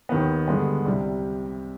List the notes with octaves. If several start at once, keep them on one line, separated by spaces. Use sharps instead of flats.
D#2 D#3 B3
G2 D3 G#3 B3
C2 C3 G3